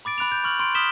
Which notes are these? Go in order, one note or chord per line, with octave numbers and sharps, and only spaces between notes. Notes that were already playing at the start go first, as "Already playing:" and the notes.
B5 D6 A6 D7
B5 F#6 D7 F7
G6
C#6 F6 F#7
C6 D7
D#6 F6 B6 E7 G7